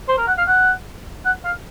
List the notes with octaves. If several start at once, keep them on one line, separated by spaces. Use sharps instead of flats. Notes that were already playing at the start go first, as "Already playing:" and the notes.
C5
A#4
F#5
F5
F#5
F#5
F5